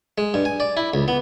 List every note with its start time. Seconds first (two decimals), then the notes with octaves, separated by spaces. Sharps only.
0.18 G#3
0.34 G2
0.45 G#5
0.60 D5
0.77 E4
0.94 C#2
1.08 B3